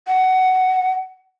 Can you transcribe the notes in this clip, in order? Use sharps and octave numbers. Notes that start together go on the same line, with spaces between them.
F#5